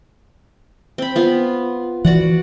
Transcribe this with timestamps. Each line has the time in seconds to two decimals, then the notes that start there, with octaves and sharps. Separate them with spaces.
0.98 C4 B5
1.16 B3 F4
2.05 E3 F#4 D5 F#5